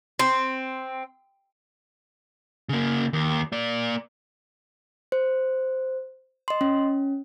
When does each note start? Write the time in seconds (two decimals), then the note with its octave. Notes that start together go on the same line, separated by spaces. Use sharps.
0.19 C4
2.69 C#3 A#3
3.13 D#2
3.52 A#3 D5
5.12 C5
6.48 D#5 C6
6.61 C#4